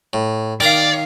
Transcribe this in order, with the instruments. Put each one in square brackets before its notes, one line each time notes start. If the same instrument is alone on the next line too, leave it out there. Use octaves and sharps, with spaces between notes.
[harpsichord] A2
[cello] D#3 F5 [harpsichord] G4 A#4 A#5 [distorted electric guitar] D5